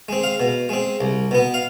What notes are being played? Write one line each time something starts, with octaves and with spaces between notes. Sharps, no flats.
G#3 C4
F5
B2
G#3 C4
C2
B2 B3
F5